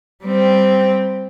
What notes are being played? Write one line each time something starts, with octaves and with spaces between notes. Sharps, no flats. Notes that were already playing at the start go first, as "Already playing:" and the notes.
G3 C4